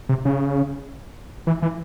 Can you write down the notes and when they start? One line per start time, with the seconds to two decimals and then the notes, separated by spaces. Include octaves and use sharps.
0.09 C3
0.25 C#3
1.47 E3
1.62 E3